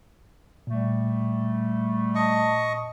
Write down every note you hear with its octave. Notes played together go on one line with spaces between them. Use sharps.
A#2 G3 A3
D#5 A5 C#6